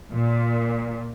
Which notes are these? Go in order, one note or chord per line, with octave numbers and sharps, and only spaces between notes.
A#2